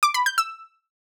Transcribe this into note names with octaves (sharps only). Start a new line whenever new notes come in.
D6
B5
G6
E6